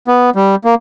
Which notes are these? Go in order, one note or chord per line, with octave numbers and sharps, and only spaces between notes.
B3
G3
A#3